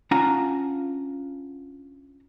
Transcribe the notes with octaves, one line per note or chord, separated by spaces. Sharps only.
C#4 D4 F4 F#5 A#5